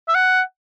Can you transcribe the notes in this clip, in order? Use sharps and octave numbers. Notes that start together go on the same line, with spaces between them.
E5
F#5